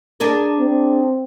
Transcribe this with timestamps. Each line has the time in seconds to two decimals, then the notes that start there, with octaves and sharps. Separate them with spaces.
0.20 D4 G#4 A#4
0.59 C4